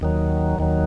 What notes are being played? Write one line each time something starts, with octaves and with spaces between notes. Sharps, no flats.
D#2 D#3 F#3
D#2 D#3 F#3